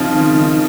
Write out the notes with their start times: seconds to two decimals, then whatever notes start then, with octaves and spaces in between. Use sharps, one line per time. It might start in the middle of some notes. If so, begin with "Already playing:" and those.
Already playing: C#3 F3 C4 D#4
0.15 D#3
0.35 D#3